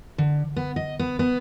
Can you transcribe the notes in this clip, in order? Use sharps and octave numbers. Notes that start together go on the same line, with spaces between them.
D3
B3
D#5
B3
B3